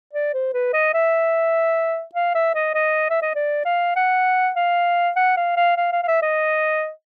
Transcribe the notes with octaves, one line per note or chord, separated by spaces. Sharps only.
D5
C5
B4
D#5
E5
F5
E5
D#5
D#5
E5
D#5
D5
F5
F#5
F5
F#5
F5
F5
F5
F5
F5
E5
D#5